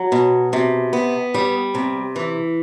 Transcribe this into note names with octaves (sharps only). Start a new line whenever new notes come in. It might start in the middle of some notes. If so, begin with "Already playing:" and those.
Already playing: F#3
B2
C3
B3
G3
C3
E3